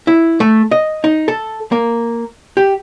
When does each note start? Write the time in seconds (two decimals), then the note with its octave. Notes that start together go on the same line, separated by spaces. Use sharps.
0.07 E4
0.40 A3
0.71 D#5
1.04 D#4
1.28 A4
1.72 A#3
2.57 G4